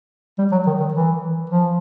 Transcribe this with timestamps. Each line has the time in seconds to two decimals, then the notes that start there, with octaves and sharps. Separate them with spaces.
0.39 G3
0.52 F#3
0.67 D#3
0.80 D#3
0.94 E3
1.50 F3